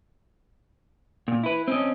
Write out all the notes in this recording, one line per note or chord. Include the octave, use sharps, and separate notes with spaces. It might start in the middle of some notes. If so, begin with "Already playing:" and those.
A#2
E4 B4
C4 C#4 D#5